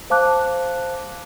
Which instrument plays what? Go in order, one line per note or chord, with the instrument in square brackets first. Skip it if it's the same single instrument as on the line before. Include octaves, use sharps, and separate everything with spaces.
[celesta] C5 F5 A5 D6 F#6